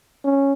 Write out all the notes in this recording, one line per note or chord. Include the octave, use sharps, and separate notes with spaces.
C#4